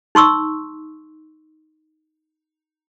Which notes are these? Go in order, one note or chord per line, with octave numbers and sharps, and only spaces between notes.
D#4 C6 C#6 E6